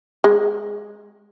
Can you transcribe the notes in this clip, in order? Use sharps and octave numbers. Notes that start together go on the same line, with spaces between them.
G#3